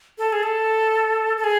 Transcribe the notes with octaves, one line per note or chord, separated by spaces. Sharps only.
A4
G#4
A4
A4
G#4